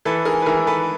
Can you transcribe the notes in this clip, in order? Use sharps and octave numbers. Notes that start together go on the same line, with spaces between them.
E3 A4 B4
G#4 A#4
B4
E3 G#4 A#4
A4 B4